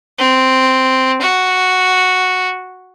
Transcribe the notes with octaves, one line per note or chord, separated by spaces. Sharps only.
C4
F#4